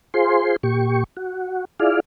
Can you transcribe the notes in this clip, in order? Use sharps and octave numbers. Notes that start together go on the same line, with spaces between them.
F4 G#4 C5 C6
A#2 G4 C#6
F#4
E4 F4 G#4 D5 F5